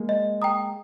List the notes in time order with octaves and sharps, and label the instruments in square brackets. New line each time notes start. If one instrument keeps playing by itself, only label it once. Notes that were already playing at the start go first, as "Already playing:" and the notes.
Already playing: [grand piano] G#3 A#3
[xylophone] D#5
G5 A#5 D#6